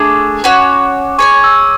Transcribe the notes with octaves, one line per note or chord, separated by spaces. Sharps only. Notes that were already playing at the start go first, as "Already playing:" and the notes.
Already playing: A3 D4 G#4 D6
C#4 F#4 C#5
G#4 C#5 G#5 C#6
E6